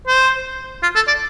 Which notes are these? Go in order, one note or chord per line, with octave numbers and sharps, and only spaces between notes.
C5
F4
A4
D5